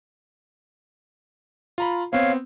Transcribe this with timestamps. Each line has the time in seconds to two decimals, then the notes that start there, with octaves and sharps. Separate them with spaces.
1.78 F4 A#5 B5
2.13 B3 C4 C#5 F5